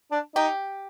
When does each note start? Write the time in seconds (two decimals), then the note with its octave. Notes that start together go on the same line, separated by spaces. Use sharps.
0.11 D4
0.36 D#4 G4